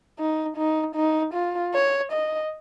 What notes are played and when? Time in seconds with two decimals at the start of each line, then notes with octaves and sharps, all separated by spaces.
0.19 D#4
0.57 D#4
0.95 D#4
1.34 F4
1.74 C#5
2.12 D#5